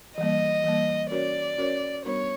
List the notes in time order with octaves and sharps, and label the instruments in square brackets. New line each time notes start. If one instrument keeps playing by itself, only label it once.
[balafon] E3 G3 A#3 [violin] D#5
[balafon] E3 G3 A#3
[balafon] C#4 F#4 A#4 C#5 [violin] D5
[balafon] C#4 F#4 A#4 C#5
[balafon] G3 B3 D4 F#4 A#4 [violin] C#5